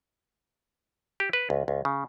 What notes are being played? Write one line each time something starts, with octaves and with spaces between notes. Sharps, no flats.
G4
B4
C#2
C#2
C#3